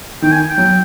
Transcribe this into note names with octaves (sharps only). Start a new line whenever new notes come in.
D#3 G5
G#5
G5
F#3